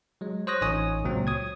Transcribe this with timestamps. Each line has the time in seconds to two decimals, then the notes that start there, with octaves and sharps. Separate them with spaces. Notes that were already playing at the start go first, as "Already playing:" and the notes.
0.21 F#3 G#3
0.47 C5 C#5 D#6 F#6 A#6
0.61 A1 D#4 C#5 G#5 D#6
1.04 C#2 A#2 F#3 C4
1.27 C#5 D#6 G#6